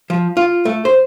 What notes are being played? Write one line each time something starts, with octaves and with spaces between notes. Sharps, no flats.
F3
F4
A3
C5